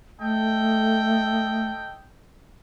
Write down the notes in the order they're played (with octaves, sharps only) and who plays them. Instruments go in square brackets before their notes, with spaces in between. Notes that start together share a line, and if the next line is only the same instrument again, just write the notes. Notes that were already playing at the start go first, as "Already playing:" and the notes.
[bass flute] A3 [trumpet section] A4 D#5 G5